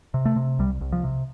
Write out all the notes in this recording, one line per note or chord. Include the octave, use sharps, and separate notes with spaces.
C3
A3
C3
C2 G3
C2
F3
C3